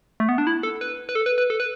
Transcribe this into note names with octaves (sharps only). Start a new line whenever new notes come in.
A3
B3
D4
E4
A4
B4
B4
A4
B4
B4
A4
B4